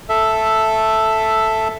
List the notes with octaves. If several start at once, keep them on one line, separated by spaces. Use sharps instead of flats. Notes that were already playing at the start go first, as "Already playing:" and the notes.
A4 E5